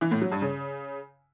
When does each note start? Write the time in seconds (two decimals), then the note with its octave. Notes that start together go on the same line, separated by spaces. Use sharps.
0.01 E3
0.11 A2
0.21 F#3
0.32 G2
0.42 C#3